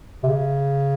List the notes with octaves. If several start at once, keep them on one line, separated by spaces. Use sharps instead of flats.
C3
C#3